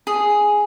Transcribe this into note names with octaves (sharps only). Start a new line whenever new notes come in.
G#4